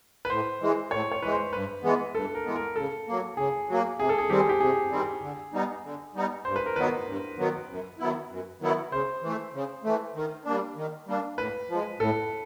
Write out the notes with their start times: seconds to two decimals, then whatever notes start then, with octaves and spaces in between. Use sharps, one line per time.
0.25 B4
0.30 A2 C5
0.61 E3 G#3
0.91 A2 C#5
1.12 C#5
1.22 E3 G#3 B4
1.32 C5
1.53 G2 B4
1.83 E3 G#3 B3
2.15 G2 A4
2.35 A#4
2.45 E3 G#3 B3
2.56 A#4
2.76 C#3 A4
3.07 F#3 A#3
3.37 C#3 G#4
3.69 F#3 A#3
3.99 C3 G#4
4.09 A4
4.18 G#4
4.29 D#3 G3 C4 G4
4.40 G#4
4.49 G4
4.60 C3 G#4
4.91 D#3 G3 C4
5.22 D3
5.53 G3 B3 D#4
5.84 D3
6.15 G3 B3 D#4
6.45 G2 C5
6.56 B4
6.66 A#4
6.76 D#3 F#3 B3 B4
7.07 G2
7.38 D#3 F#3 B3
7.69 F#2
7.99 D#3 F#3 B3 E4
8.30 F#2
8.61 D#3 F#3 B3 E4
8.91 C#3 C5
9.22 E3 A3
9.53 C#3
9.84 E3 A3
10.15 D#3
10.45 G3 A#3 D4
10.76 D#3
11.07 G3 A#3 D4
11.37 A2 B4
11.69 F3 G#3
12.00 A2 A4